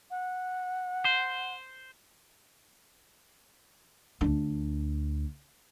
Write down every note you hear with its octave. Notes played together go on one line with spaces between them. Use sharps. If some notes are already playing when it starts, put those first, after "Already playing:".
F#5
C5
D2 D4